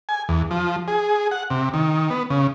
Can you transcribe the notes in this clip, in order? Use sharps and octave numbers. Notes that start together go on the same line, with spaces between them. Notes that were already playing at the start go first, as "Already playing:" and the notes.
G#5
E2
F3
G#4
F#5
C3
D#3
B3
C#3